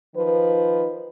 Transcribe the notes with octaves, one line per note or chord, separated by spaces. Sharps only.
D#3 F3 B4